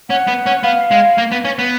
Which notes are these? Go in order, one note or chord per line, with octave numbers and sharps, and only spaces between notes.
C#4 F#5
B3
C#4
B3 F5
G#3
A#3
B3
C#4
B3